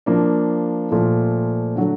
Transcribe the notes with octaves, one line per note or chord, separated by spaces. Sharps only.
F3 A#3 D4
A#2 F3 A3
D3 F#3 A3